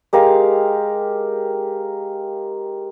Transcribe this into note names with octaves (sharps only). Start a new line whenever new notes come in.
G#3 G4 A#4 F5